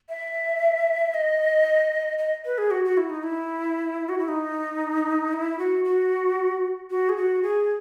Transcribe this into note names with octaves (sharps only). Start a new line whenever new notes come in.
E5
D#5
D#5
B4
G#4
F#4
F#4
E4
D#4
E4
F#4
E4
D#4
E4
F#4
F#4
F#4
G#4
F#4
G#4